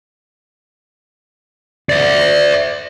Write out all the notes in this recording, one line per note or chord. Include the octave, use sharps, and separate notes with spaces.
D5 E5